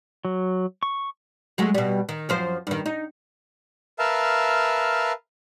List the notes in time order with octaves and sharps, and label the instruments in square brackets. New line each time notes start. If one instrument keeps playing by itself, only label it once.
[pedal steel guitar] F#3
C#6
[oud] F#3 G#3 A3
B2 G3
D#3
F#2 F3 C5
G2 D#3
D#4
[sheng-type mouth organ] A#4 B4 E5 F5 A5